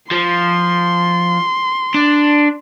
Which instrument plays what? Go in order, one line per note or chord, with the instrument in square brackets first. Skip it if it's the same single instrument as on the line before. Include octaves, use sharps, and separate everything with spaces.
[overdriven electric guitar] F3 [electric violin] C6
[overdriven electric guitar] D4